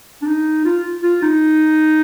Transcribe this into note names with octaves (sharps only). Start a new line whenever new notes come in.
D4
D#4
F4
F4
D#4